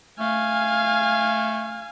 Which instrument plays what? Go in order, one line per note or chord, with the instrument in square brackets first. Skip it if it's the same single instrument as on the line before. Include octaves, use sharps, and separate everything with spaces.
[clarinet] A3 [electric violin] F5 G#5